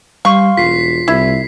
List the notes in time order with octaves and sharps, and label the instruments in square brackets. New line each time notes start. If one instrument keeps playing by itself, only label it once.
[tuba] G3 [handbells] F5 C6 [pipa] C#6
[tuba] E1 [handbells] F4 [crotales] B6 C7
[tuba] C2 [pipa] E4